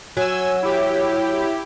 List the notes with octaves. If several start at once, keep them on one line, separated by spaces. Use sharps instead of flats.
F#3 G#5 E6
E4 G4